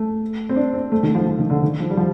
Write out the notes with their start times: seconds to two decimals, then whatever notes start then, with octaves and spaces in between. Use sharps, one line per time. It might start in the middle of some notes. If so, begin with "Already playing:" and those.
Already playing: A3
0.49 C4
0.56 D4
0.74 C4
0.92 A3
1.03 D#3
1.15 F3
1.27 F3
1.39 D#3
1.50 D3
1.62 D#3
1.80 F3
1.90 G3
1.97 F3